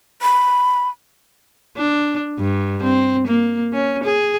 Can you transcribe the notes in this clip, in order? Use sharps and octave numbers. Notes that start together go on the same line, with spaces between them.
B5
D4
G2
C4
A#3
C#4
G#4